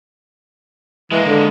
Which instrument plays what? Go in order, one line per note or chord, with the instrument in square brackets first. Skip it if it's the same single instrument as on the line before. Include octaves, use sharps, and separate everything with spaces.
[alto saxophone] E3 [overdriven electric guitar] G#3 A#3
[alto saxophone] D3